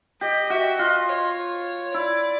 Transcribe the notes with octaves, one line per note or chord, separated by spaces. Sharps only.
G4 D#5
F#4 E5
F4 D#5
C#5
E4 D5